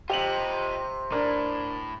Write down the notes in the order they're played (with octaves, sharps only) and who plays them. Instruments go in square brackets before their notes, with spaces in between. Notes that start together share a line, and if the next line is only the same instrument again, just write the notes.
[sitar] C3 [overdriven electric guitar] F4 D#5 [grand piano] G4 F7 F#7
[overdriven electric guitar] A2 [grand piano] D4 A#4